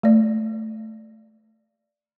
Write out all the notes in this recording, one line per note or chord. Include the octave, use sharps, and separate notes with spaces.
A3 D5